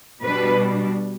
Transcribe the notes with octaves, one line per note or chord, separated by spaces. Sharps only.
B2 G3 D4 B4